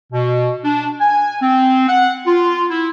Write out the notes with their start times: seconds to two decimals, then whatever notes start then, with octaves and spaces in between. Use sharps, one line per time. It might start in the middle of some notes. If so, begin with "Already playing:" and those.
0.13 B2
0.64 D4
1.01 G#5
1.41 C4
1.88 F#5
2.26 F4
2.70 E4